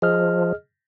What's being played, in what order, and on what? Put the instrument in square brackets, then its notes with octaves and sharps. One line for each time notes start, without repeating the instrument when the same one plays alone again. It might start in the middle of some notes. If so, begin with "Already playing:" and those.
[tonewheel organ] F3 [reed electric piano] G#4 D#5 F6